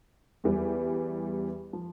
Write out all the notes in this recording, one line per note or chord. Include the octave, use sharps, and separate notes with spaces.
E2 E3 G3
F3